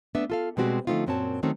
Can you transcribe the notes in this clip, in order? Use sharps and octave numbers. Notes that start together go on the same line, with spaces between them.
A3 B3 D4 E5
F4 A4 F5
B2 G3 G#3 C4 F#4 G4
D3 F3 A3 C4 D#4 F4
F#2 A#2 C4 F#4 C#5 A5
D#3 F#3 A3 C4 C#4